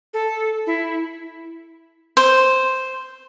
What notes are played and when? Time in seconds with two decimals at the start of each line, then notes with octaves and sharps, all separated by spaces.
0.14 A4
0.67 E4
2.17 C5